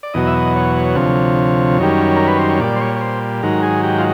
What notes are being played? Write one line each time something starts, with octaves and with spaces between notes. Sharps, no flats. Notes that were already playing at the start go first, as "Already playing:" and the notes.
D5
E2 B2 F#3 D#5
E5
D#5
C#5
C#5
D2 C3 F3
F#2 D#3 G3
A#4
B4
C5
C#5
A#2 G3 D5
C5
C#5
C#5
C5
G#2 D#3 F#3 A#4
G#4
G4
F4